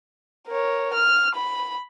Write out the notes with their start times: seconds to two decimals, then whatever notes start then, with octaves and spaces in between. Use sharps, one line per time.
0.48 A#4 C#5
0.94 F6
1.36 B5